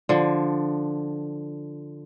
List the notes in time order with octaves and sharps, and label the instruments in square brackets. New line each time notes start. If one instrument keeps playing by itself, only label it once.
[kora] D3 F3